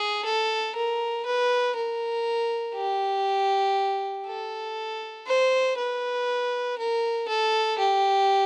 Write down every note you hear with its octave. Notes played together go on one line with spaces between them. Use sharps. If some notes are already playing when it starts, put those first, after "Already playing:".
Already playing: G#4
A4
A#4
B4
A#4
G4
A4
C5
B4
A#4
A4
G4